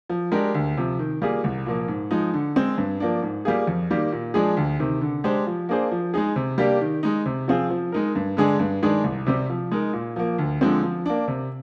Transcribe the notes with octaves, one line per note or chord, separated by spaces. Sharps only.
F3
G#3 D4 G4 A#4
D2
C3 F3
D#3
G3 A#3 F4 G#4
C2
A#2 F3 A#3
G#2
F3 G#3 D#4
D3
G#3 C4
G2
F3 A#3 D4
G#2
G3 A#3 F4 G#4
F2
D#3 G3 A#3
A#2
F3 G#3 D4 G#4
D2
C3 D#3
D3
G#3 D4 G4 C5
F3
A#3 D4 G#4 C5
F3
G#3 D#4 G#4
C3
G3 A#3 D4 G4
D#3
G#3 D#4
C3
F3 C4 F4 G#4
F3
G#3 D#4 A#4
G2
D3 G#3 D4 G#4
G2
D#3 G#3 D4 G#4
C2
C3 G3 C4
F3
G#3 D#4 A#4
A#2
F3 A#3
D2
D3 F3 G#3 C4
F3
A#3 D4
C3